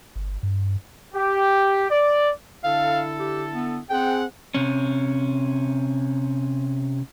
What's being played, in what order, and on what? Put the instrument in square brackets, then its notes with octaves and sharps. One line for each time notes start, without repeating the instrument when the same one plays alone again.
[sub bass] G1
G2
[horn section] G4
D5
[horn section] D3 E4 A4 [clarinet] F5
[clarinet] G4
B3
[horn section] C4 G#4 F#5 [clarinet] G5
[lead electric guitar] C3 C#4